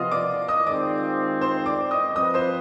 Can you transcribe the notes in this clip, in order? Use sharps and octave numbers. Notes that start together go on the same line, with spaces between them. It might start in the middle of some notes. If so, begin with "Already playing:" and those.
Already playing: C3 F3 B3 F4 D#5 F5 D#6 F6
D5 D6
D#5 D#6
D#3 G#3 C4 F4 D5 D6
C5 C6
D5 D6
D#5 D#6
F3 C4 F4 B4 D#5 D#6
C5 C6